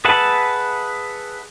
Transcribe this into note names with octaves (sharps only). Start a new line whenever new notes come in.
G#4 B4 E5 F#5 A5